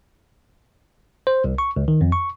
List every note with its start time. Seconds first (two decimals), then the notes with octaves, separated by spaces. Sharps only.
1.27 C5
1.44 C2
1.58 C#6
1.76 C#2
1.88 D#3
2.01 F2
2.12 C#6